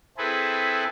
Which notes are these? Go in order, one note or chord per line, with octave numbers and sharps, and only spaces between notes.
C4 E4 G#4 A4 B4